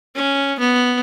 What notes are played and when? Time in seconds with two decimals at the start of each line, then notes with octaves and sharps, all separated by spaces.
0.15 C#4
0.59 B3